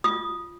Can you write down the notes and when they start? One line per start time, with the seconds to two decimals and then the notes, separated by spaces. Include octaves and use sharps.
0.04 F4 D#6